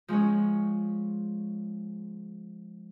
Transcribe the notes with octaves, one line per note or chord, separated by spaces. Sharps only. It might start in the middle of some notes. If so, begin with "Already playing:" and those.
F3 G#3 C#4 C#5